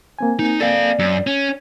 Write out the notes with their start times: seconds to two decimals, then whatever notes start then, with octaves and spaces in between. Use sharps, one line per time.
0.19 A#3 C4 G#5
0.39 D#4
0.60 A4 D5 F5
0.99 F#2
1.27 C#4